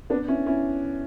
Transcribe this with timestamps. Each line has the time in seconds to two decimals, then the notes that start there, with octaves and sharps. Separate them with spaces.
0.10 B3 D4
0.28 C#4 E4
0.46 C#4 E4